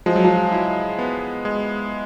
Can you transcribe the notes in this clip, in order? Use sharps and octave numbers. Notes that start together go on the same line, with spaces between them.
F3 G#3
F#3
F3
E4
B3
G#3